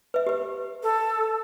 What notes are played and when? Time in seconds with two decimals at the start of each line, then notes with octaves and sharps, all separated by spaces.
0.14 B4 E5
0.27 G4 B4
0.83 A4